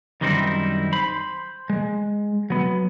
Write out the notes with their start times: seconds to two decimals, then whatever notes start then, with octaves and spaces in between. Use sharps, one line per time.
0.21 F#2 D#3 G3 C4 D#4 E4
0.93 C5 B5
1.70 G#3
2.50 F#3 B3